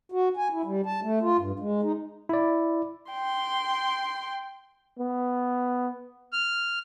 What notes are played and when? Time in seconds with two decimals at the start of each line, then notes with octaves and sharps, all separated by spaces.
0.12 F#4
0.37 G#5
0.52 E4
0.65 G3
0.86 A5
1.03 A3
1.21 F4
1.39 G2
1.59 G#3
1.83 D#4
2.29 E4 D5
3.12 G5 C6
4.99 B3
6.33 F6